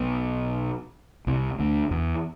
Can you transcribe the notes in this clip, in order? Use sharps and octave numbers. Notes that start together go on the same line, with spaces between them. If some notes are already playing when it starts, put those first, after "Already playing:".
Already playing: B1 B2
C2 C3
D2 D3
E2 E3